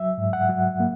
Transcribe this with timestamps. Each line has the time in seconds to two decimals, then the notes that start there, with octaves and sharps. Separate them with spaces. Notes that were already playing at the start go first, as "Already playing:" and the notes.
Already playing: F#3 E5
0.18 G#2
0.33 F#5
0.49 F#3
0.80 A#3